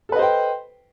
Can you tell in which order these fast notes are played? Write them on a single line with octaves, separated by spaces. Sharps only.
A4 B4 D#5 C5 G5